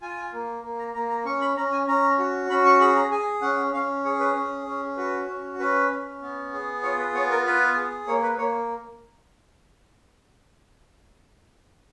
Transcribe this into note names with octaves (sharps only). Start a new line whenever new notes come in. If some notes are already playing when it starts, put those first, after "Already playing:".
F4 G#5
A#3
A#3
A#5
A#3 A#5
A#5
C#4 C#6
B5
C#4 A#5
G#5
C#4 A#5
F#4
C#4 B5
C#6
G#4 B5
A#5
G#4 G#5
C#4 F#5
C#4 F5
G#4 C#5
B4
C#4
C#4
F#4 B4
C#4
C#4 B4
C#4
B3
G#4
F4 C#5
B4
B3 C#5
A#4
F4 B4
G#4
A#3 C#5
B4
A#3 C#5